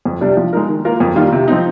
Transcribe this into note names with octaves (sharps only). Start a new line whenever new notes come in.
F2
C3 G3 D4
F3
G#3 D#4 A#4
D#3
A#3 F4 A#4
F2
D#3 G3 A#3 F4
C3
F3 C4 D#4